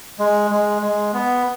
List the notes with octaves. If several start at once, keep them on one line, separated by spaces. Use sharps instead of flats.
G#3
G#3
G#3
B3